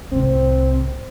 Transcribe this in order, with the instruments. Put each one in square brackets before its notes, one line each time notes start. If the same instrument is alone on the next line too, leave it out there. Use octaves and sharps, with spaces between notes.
[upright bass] C2 A2 [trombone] C4